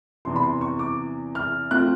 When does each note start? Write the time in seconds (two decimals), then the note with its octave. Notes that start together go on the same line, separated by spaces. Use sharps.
0.25 E2 C3 E3 C6
0.36 B5
0.43 C6
0.61 C#6
0.79 D6
1.35 F6
1.71 F3 A3 C4 F#6